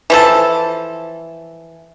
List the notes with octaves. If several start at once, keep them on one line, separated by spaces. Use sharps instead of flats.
E3 F3 A4